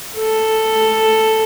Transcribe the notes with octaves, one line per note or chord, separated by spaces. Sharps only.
A4